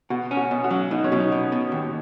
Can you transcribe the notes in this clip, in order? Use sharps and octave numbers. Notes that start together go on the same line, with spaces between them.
B2 F#4
C#4
F#4
B2
F#4
F#3
B2 D#4
C#4
B2
D#4
B2
B2
D#2